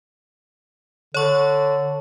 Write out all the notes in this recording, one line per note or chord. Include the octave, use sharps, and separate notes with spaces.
D3 C#5 C#6